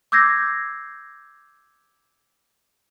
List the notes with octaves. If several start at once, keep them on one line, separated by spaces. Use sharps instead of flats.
D6 E6 G6 G#6 A#6 C7